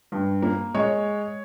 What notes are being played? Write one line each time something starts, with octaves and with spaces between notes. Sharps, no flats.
G2
A#3
G#3 C#5